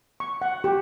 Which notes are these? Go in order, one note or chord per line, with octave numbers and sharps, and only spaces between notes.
C#6
F#5
G4